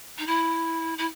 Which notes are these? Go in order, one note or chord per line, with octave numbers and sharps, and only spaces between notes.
D#4
E4
E4